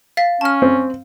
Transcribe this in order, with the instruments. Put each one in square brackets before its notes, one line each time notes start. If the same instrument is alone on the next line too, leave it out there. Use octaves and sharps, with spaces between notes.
[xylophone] F5 A6 B6
[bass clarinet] C#4 [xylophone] A5 F6
[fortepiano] C4